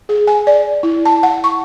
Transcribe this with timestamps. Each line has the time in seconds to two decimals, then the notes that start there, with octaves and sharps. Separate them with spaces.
0.09 G#4
0.27 G#5
0.47 D5
0.83 E4
1.05 A5
1.23 F#5
1.44 C#6